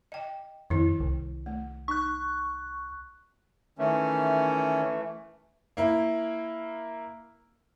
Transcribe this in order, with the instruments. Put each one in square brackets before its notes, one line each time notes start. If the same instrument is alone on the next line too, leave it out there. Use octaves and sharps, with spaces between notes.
[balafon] D#5 G5
[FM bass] F2 [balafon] D#3 E4
[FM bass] C2
[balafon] A3
[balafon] D#4 [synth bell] C#6 F#6
[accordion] D#3 C#4 [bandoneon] E3 A3
[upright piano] A#3 E4